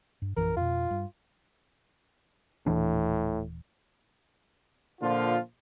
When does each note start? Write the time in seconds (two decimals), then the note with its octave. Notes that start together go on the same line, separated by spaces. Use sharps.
0.22 G2
0.36 A#1 F#2 E3 A#4
0.57 F2 B2 F4
0.91 G2
2.67 D#1 A2 E3 D4
5.01 A#2 D3 F3 F4